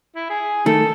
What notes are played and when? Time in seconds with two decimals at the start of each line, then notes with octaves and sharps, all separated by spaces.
0.15 E4
0.30 G#4
0.66 D#3 A3 A4